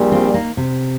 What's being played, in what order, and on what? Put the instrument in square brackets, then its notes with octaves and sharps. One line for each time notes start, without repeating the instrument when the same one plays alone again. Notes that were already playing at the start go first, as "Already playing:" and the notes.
Already playing: [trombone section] A#1 A#2 G3
[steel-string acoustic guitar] C4 F4
A#3 D#4
C3